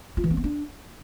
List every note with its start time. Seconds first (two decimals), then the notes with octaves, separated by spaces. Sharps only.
0.17 F4
0.24 E3
0.30 C4
0.37 B3
0.44 D4